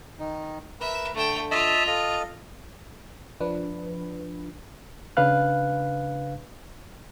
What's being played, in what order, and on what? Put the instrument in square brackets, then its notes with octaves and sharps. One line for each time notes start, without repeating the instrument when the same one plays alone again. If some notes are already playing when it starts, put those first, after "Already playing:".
[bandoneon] D#3 D#4
[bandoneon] A#4 B4 [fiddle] E5
[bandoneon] D3 [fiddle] A3 G5
[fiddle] F4 [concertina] D#5 E5 A5
[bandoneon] A4 F5 [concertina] D#5
[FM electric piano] F3 D4 B4
[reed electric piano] C#3 D4 B4 F5 F#6